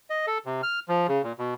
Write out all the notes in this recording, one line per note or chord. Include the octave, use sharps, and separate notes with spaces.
D#5
A4
C3
F6
F3
C#3
A#2
B2